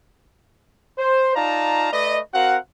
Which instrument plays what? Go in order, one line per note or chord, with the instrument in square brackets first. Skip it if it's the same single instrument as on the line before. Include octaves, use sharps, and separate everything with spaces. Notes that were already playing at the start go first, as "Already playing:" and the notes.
[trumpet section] C5
D#4 F4 D5 F5 A5 A#5
A3 B4 D5 D#5
C4 F#4 A#4 F5 F#5